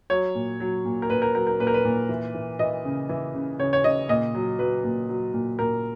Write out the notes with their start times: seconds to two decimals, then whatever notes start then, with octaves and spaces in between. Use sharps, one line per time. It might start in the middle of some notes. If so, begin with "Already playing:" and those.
0.10 F#3 C#5
0.35 A#2
0.60 F#3
0.85 A#2
1.02 A#4
1.10 A#2 B4
1.22 A#4
1.34 F#3 A#4
1.47 A#4
1.60 A#2 B4
1.67 A#4
1.74 B4
1.85 A#2
2.09 E3
2.34 E3
2.59 E3 D#5
2.85 C#3
3.09 E3
3.35 C#3
3.59 C#3 C#5
3.73 C#5
3.84 C#3 D#5
4.09 A#2 D#5
4.35 F#3
4.59 F#3 B4
4.84 A#2
5.09 F#3
5.34 A#2
5.59 A#2 A#4